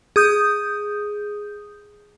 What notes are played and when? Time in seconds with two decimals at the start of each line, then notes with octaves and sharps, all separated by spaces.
0.16 G#4 D#6 G6